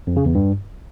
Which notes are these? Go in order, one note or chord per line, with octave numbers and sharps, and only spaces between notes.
F2
C#3
E2
G2